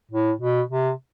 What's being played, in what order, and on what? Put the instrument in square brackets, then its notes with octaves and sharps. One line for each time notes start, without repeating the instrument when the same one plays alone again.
[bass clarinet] A2
B2
C3